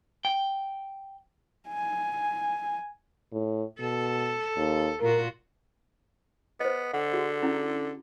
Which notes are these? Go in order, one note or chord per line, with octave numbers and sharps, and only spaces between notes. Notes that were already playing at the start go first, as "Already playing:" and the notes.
G5
G#5
A2
B2 A4
D#2
A#2 F4 F#4 A#4
B3 C5 D#5
D3 F#5
F#4 G#4
C#4 E4 A#5